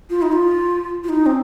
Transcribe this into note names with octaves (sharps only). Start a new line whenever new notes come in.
F4
D#4
F4
F4
D#4
C4